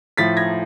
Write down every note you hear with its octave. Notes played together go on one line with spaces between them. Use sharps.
A2 F3 A6 B6
G#6 A#6